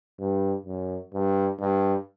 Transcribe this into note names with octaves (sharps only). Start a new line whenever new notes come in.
G2
F#2
G2
G2